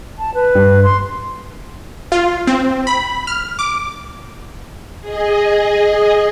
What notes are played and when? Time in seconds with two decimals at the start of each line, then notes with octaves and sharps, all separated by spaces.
0.19 A5
0.35 B4
0.55 G2
0.83 C6
2.12 F4
2.47 C4
2.87 B5
3.27 F6
3.59 D6
5.01 G#4 D#5